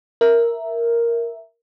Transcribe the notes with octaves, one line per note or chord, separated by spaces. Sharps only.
A#4 E5